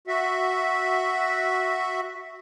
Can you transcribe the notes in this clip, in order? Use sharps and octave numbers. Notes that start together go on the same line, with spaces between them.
F#4 E5